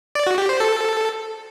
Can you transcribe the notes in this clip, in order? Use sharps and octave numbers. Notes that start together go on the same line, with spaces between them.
D5
F#4
G4
C5
A4